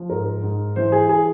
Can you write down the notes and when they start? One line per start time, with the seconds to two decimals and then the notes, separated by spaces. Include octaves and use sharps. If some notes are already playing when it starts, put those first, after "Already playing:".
Already playing: F3
0.10 G#2 A#4
0.42 G#2
0.76 E3 C5
0.92 G#4
1.09 G#4